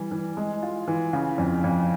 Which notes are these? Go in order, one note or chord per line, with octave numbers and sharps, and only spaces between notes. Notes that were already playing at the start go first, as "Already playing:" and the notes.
Already playing: E3 G3
E3
G#3
F4
E3
C#3
F2
F2